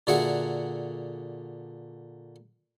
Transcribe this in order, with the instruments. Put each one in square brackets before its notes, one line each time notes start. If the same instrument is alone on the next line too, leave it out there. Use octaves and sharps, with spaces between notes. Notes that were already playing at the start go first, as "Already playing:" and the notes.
[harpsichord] A#2 D3 F#4 G#4 E5 F#5